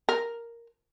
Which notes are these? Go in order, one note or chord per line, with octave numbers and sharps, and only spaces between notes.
A#4